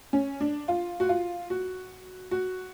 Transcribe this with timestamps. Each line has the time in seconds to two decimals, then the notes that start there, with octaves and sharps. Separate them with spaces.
0.13 C#4
0.40 D4
0.68 F4
1.00 F#4
1.09 F4
1.50 F#4
2.31 F#4